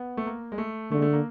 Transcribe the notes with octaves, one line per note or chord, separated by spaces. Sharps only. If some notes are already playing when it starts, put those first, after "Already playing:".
Already playing: B3
A3
A#3
G#3
A3
D3 A3
G#3
A3
A#3